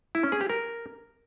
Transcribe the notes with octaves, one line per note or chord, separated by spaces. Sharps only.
E4
C#4
G#4
G4
A#4